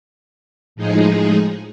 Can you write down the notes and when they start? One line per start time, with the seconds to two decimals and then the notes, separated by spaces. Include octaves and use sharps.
0.76 A2 F3 G#3 D#4 G#4